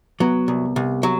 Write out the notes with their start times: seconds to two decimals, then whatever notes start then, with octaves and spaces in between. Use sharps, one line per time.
0.20 F#3 B3
0.48 C2
0.76 C2
1.03 F#3